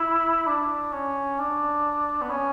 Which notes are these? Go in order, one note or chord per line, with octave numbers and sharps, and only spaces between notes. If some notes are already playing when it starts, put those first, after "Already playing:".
Already playing: E4
D4
C#4
D4
B3
C#4